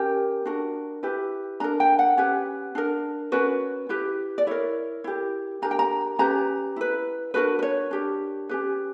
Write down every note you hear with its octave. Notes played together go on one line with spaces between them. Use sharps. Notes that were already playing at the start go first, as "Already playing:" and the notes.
Already playing: C#4 G4 A#4 G5
D4 F#4 A#4
E4 G4 B4
D4 A#4 A#5
G5
F#5
C#4 G4 B4
D4 A#4
C#4 F#4 A#4 B4
E4 G4 B4
D5
E4 A#4 C#5
E4 G4 A#4
D4 G4 A#4 A#5
G5
A#5
C#4 G4 B4 A#5
E4 B4
D4 F#4 A#4 B4
B4
C#5
D4 G4 A#4
C#4 G4 B4